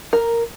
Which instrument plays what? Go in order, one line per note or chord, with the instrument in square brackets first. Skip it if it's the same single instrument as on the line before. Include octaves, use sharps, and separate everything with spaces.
[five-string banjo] A#4